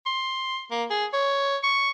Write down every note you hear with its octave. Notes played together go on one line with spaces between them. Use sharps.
C6
A#3
G#4
C#5
C#6